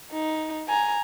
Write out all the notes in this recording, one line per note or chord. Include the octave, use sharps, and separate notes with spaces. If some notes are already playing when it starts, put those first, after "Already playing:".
D#4
G#5 A#5